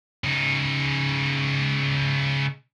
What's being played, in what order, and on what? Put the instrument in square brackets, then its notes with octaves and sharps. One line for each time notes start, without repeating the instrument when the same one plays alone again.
[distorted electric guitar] C#3 D#4